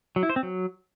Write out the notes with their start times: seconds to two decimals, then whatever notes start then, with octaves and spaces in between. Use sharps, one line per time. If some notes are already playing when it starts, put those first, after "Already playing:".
0.16 F#3
0.23 E4
0.30 C5
0.36 C4
0.43 F#3